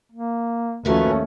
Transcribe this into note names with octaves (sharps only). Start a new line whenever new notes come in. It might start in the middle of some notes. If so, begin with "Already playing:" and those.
A#3
D#2 F3 A3 C#4 F#4 A#4 B4